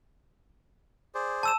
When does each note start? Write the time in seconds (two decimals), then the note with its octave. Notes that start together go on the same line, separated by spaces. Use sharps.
1.15 G#4 C5 D5
1.43 A5 E6 E7